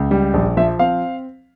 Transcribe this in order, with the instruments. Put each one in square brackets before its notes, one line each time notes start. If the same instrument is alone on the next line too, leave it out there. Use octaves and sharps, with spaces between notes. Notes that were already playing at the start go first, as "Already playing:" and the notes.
Already playing: [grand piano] C#2
G3
A#1
F3 E5
C4 F5